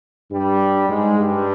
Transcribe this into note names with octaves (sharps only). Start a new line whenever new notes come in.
G2 G3
G#2 G#3
G2 G3